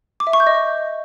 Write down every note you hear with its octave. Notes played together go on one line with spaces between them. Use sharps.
D6
E5
C#6
G6
D#5